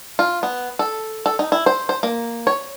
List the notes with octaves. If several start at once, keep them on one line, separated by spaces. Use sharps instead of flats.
F4
B3
A4
A4
D#4
E4
C5
C5
A#3
C#5